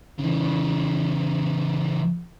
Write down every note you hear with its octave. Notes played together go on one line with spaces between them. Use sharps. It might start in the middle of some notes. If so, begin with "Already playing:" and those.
C#3 E3